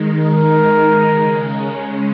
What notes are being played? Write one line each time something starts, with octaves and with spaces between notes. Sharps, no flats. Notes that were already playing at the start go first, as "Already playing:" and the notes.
Already playing: D#3 G#3 D#4
A#4
C#3 G#3 C#4